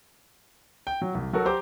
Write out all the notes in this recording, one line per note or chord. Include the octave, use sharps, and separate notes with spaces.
G5
F#3
C2
F#3 F#4 A4 A#4
G4 C5 A#5 D6